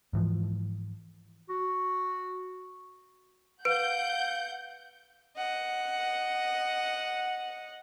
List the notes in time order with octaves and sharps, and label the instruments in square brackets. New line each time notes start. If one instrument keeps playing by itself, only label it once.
[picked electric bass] G#2 E3 F3
[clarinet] F#4
[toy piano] B4 [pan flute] F5 [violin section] F#5 G6 [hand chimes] D7
[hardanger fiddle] D#5 F#5